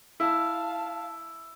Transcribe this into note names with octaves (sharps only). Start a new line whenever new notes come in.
E4 F5 A5